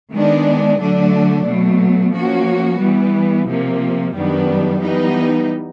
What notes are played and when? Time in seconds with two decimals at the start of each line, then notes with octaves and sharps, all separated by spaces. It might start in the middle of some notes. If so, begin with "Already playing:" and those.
0.12 D#3 G#3 B3 D4
0.79 D3 F#3 A3 D4
1.45 B2 F#3 A3
2.13 F3 A#3 C#4 F#4
2.80 E3 G3 B3
3.47 C3 F3 A#3
4.14 F#2 D#3 G3 B3 D4
4.81 E3 G3 B3 D#4